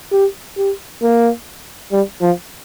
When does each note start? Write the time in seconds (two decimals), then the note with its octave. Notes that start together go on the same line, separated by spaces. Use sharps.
0.12 G4
0.57 G4
1.02 A#3
1.92 G3
2.22 F3